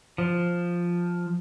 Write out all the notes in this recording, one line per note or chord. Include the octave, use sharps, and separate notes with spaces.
F3